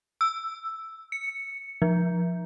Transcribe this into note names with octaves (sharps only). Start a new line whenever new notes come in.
E6
C#7
F3